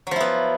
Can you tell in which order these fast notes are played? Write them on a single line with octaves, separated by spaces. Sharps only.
F#3 F3 E4 B3